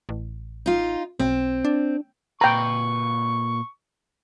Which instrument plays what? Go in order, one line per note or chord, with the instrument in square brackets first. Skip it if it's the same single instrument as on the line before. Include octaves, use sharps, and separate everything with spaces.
[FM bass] A1
[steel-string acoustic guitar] D#4 F4
[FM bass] B1 [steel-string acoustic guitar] C4
[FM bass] D4
[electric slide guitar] A#2 B4 [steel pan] G5 A#5 [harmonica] C#6